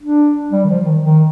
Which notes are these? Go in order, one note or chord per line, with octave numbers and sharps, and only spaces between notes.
D4
G3
D#3
F3
D#3
D#3